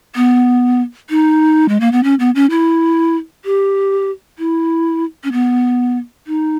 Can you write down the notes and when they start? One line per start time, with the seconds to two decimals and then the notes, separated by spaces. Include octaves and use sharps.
0.16 B3
1.10 D#4
1.69 G#3
1.80 A#3
1.92 B3
2.04 C#4
2.20 B3
2.35 C#4
2.50 E4
3.45 G4
4.39 E4
5.24 C#4
5.32 B3
6.27 D#4